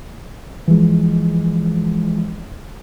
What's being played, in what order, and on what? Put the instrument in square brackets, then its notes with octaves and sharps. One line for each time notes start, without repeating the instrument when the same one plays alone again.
[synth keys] E3 F3 G#3